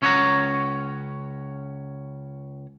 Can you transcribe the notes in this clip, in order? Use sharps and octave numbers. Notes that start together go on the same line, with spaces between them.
C#2 C#4 C#5 D#5 F#5 A#5